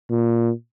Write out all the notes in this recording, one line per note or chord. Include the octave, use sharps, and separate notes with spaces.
A#2